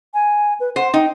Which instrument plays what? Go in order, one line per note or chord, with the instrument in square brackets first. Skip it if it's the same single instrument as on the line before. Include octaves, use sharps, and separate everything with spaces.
[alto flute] G#5
B4
[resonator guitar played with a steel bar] C5 [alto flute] F#5
[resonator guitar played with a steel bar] D#4 [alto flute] G5